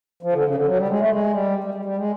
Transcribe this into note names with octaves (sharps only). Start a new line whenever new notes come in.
F3
D3
C#3
D3
F#3
G3
G#3
A3
G#3
G3
G3
G3
G3
G#3